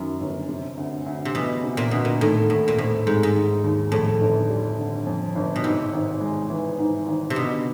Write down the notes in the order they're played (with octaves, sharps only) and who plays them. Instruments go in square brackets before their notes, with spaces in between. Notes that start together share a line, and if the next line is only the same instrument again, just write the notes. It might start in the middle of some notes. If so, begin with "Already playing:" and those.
Already playing: [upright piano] F#2 D#3
G1
C3
D2
D2
[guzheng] C3
[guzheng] B2 [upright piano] E3
[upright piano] C3
[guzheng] A#2
[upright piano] D2 [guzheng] B2
[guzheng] A#2
[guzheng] A2 [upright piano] D#3
[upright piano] D#2 [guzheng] A2
[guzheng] A#2
[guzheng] A2 [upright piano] C4
[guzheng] G#2 [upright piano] G#3
[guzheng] G#2
[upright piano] D#3
D#2
[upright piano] F2 [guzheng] A2
[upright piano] G1
G3
D3
F2
G1
[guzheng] B2
[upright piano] G#2 [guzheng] C3
[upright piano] G#1
G#3
E3
G#2
G#1
[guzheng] C3
[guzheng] B2 [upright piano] D3